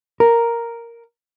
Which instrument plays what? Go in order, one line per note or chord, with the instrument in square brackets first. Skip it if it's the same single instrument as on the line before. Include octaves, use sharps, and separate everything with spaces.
[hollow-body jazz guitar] A#4